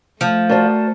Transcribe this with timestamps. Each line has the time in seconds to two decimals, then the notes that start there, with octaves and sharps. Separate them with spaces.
0.21 F3 A3 A5
0.49 F#4 A#4 C5 D5 A5